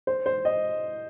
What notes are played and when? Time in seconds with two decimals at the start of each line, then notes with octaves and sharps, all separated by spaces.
0.07 C5
0.26 C5
0.45 D#5